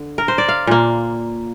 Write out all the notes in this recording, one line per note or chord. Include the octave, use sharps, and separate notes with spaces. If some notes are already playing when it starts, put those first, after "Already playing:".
Already playing: D3
A#4
C5
D5
F5
A#2 A#3